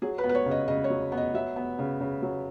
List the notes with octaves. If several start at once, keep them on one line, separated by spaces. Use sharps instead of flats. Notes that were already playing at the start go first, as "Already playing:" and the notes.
F#3 G#4
B4
B3
B4
C#5
C#3
D#5
C#3 D#5
C#5
F#3
B3
D#5
F#3 E5
B3
C#3
C#3
F#3